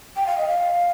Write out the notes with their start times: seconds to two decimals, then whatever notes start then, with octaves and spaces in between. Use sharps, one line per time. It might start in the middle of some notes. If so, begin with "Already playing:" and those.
0.16 G5
0.27 F5
0.38 D#5
0.48 F5